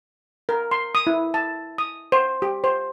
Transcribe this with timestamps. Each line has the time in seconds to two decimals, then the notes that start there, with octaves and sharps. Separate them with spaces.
0.49 A#4
0.71 C6
0.95 D#6
1.07 E4
1.34 A5
1.78 D#6
2.12 C5
2.42 G4
2.64 C5